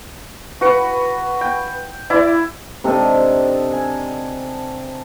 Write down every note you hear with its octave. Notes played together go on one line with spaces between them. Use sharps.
F#4 B4 C#7
G5
E4 D5
C3 D4 D#4 A4
G#5